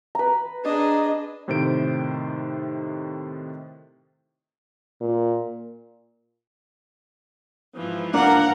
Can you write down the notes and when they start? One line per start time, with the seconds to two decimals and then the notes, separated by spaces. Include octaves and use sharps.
0.15 B4 A#5
0.65 D4 G#4 D#5
1.48 A2 C3 D#3 C5 G6 D7
5.01 A#2
7.75 G#2 E3 F3
8.14 A#3 D4 A#4 F#5